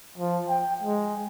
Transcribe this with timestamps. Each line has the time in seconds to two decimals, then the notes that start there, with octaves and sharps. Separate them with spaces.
0.18 F3
0.49 G5
0.82 G#3